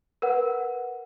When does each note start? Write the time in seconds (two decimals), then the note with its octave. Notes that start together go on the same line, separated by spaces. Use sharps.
0.22 A#4 B4 F#5